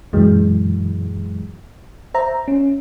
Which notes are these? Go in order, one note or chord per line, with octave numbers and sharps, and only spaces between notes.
F#2 A#2 E3 F#3 G#3
C5 E5 A#5
C#4